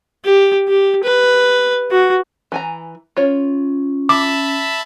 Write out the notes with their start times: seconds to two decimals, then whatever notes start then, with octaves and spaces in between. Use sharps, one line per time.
0.25 G4
0.68 G4
1.04 B4
1.91 F#4
2.52 E3 G#5 A#5
3.17 C#4 F4 C#5
4.09 E5 A5 B5 D6